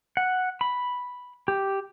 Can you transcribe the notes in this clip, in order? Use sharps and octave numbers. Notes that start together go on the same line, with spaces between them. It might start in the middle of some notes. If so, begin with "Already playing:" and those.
F#5
B5
G4